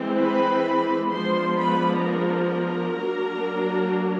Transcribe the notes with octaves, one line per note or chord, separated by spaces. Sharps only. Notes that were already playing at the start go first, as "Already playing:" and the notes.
Already playing: E3 G#3 C4
B4 B5
F3 G#3 B3 D4 C5 C6
B4 B5
A#4 A#5
F#3 A#3 D4